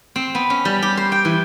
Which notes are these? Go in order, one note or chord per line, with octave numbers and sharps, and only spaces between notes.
C4
B3
C#4
G3
G4
C5
G5
E3